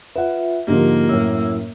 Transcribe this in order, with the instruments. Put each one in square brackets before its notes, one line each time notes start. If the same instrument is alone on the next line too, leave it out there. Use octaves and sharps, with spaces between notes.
[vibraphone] F4 E5 [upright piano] B4 F#5
[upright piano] G#2 D3 F3 [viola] A#3 [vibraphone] G4 A#4
[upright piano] F#2 A2 [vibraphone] E6